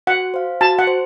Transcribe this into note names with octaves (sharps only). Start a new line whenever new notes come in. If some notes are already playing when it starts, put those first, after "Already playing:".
F#4 F#5
C5 F5
F#4 A5
F#5
C5